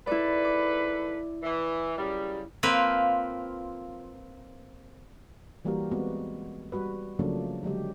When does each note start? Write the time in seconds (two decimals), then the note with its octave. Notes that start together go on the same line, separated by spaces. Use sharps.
0.07 G#2 E4 A4 B4 D5
0.44 D6
1.43 E3
1.98 F#2 C#3 G3
2.63 F3 A#3 C4 B4 F5
5.65 E3 G3 A#3 F#4 G4 A#4
5.91 G#3 B3 C4 F#4
6.72 G3 F#4 B4
7.19 C#3 F3 F#3 A3 A#3 D4
7.63 D3 F#3 G#3 G4